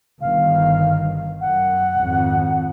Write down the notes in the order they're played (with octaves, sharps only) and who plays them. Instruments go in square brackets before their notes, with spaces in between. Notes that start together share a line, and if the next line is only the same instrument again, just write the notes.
[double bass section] G1 D#3 [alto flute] F5
[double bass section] F#2 [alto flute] F#5
[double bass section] G#1 F2